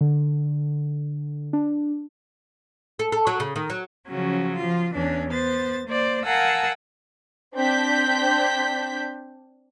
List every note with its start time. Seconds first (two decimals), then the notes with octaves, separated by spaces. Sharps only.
0.01 D3
1.53 D4
2.99 A4
3.12 A4
3.27 F#3
3.40 C#3
3.56 D#3
3.70 F#3
4.07 C#3 F3 F#3 C#4
4.56 F3 F4
4.94 E2 E3 C#4 D4
5.29 B3 C5 A6
5.87 A#3 C5 D5
6.24 A#4 F5 F#5 G#5 A5 E6
7.55 C4 D4 G6 B6